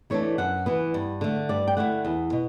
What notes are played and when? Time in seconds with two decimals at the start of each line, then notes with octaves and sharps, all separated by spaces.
0.10 E3 A3 D4 C#5
0.38 F#2 F#5
0.66 E3 B3
0.94 G2
1.21 D3 A3
1.49 G2 D5
1.68 G5
1.77 D3 A3 E4 F#5
2.05 E2
2.32 B2